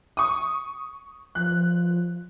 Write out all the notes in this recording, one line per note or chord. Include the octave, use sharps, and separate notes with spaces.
C#6 D#6
F3 F#6